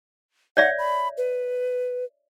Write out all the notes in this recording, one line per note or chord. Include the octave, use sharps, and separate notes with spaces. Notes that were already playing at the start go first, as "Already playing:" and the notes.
C#5 D5 E5 F#5
B5
B4